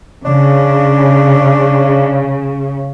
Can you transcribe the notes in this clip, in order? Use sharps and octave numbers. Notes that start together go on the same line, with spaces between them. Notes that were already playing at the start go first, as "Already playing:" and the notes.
C#3 D4